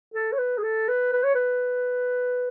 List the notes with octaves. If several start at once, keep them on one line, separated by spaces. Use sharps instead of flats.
A4
C#5
B4
G#4
A4
B4
B4
C#5
B4